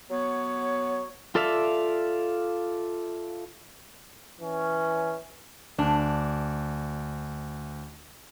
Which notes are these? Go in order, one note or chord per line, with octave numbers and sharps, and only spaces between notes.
F#3 B3 C#5
F4 A4 D5 E5 F5
E3 C#4
D2 D4